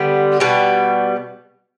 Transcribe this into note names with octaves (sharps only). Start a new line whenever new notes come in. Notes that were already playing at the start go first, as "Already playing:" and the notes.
Already playing: D3 G3 B3
B2 G3 B3